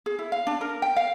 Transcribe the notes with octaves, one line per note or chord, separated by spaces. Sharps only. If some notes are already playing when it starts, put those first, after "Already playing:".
G#4
E4
F5
D4
A#4
G5
F5